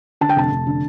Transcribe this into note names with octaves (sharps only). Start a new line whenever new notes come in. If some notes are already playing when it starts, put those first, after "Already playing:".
D3 A5
G5
F1 A5
F1
D3